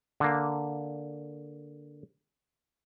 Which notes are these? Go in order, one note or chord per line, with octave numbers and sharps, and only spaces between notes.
D3 A#3